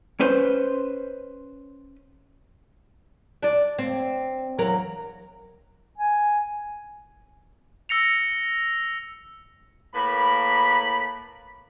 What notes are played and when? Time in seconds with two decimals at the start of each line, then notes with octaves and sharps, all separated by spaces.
0.20 C#4 B4 C5
3.42 D4 D5
3.79 C4
4.58 E2 F#3 A#4
5.98 G#5
7.89 E6 A#6 C#7 F7
9.95 A2 A#3 B4 B5